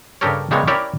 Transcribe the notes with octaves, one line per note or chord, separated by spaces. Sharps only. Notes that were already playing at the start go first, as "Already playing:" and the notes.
G2 C#3 G4 A4 A#4 C#5
C#3 G3 G#3 A#3 B3 C#5
C#4 E4 G4 A#4 C#5 D5